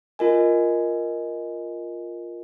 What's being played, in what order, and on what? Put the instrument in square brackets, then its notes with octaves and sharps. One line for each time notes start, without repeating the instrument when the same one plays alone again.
[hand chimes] F4 A#4 D#5 G#5